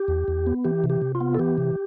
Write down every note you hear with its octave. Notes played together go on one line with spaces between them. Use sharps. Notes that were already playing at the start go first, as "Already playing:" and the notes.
Already playing: G4
E2
E2
B3
E3 G4
C3
G4
C3
F4
B3
A4
E3 G4
C3